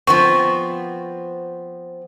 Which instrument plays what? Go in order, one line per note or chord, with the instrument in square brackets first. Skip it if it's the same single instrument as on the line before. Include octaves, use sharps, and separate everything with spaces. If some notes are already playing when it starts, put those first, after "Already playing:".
[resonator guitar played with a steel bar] F3 B3 C4 [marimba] C#6